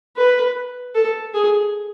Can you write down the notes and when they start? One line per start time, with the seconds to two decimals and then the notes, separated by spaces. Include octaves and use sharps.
0.16 B4
0.95 A4
1.34 G#4